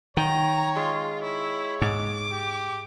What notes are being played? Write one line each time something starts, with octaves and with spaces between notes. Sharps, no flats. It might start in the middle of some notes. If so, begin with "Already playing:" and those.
D#3 C#5 G5 A#5
G#3 F4
E4 C#5
G#2 D6
G4